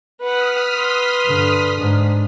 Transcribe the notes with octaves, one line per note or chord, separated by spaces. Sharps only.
B4 F#5 D#6 F6 B6
B4 C6
G2 D3
G#2 D4